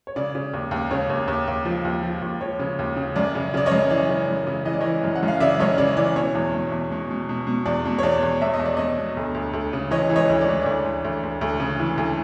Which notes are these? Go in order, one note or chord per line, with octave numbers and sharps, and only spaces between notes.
C#5
C#3 D5
C#3
D#2
D#2
C#3 C#5
D#2
D#2
D#2
F3
D#2
F3
D#2
F3 C#5
C#3
D#2
C#3
F#2 D5
C#3
C#3 D5
C#5 D#5
F#2
E3 D5
C#3
F#2
C#3
E3 D#5
D5
E3 C#5 D#5
F#2
F#5
F#2
F5
C#3 D5 E5
F#2 C#5 D#5
C#3 D5
E3 D5
B2 C#5
E2
B2
E2
B2
B2
B2
B2
E2 D5
B2
C#5
E2 D5
E2
E2 E5
D#5
E2
D5
B2 C#5 D#5
B2
D2
D2
D2
C#3
E3 C#5 D#5
E3
C#5 D#5
D2
D5
E3
D5
D2 C#5
D2
D2
D2
D2
C#3
E3
D2